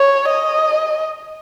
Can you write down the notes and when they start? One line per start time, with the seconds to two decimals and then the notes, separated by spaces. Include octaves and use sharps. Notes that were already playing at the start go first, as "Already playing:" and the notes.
Already playing: C#5
0.28 D#5